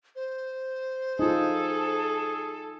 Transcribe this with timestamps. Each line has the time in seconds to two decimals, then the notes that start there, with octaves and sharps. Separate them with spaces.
0.16 C5
1.19 D#4 F4 G#4 A4